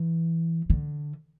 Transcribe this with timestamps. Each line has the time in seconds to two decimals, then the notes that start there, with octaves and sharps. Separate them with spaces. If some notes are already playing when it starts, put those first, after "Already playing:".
Already playing: E3
0.70 D3